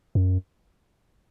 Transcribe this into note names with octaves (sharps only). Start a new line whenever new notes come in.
F#2